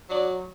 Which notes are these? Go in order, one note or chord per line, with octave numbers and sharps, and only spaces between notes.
F#3 D5